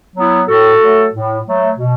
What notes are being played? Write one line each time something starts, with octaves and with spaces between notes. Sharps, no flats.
F#3 B3 E4
A2 F#4 A4
F#3 A3
A2
F#3 A3
B2